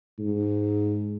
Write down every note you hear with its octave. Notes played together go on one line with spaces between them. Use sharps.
G#2